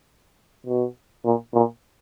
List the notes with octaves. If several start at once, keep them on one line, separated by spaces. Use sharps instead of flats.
B2
A#2
A#2